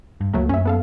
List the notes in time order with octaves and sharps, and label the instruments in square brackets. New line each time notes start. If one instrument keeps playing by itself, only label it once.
[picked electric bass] G2
[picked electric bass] C#2 [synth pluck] F#3 A3 A#3
[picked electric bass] F#2 [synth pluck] C#4 E5
[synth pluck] B3 A4 F5